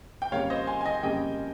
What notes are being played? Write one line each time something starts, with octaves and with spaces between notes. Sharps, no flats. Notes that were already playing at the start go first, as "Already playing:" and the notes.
G5
F2 C#3 G3 A#3 C#5 F5
C5 D#5
G#5 C6
G#5
D#5 G5
F2 C#3 G3 A#3 D#5 G5